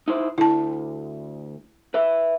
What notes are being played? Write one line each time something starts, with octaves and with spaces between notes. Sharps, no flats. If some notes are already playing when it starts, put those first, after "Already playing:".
D#4 E4 C5
D2 E4 A5
B4 E5